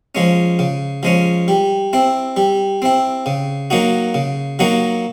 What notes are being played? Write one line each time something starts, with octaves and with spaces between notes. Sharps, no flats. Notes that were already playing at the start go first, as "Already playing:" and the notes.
F3 G#3 C#4
C#3
F3 G#3 C#4
G3
C4 E4
G3
C4 E4
C#3
F#3 A#3 D#4 F#4
C#3
F#3 A#3 D#4 F#4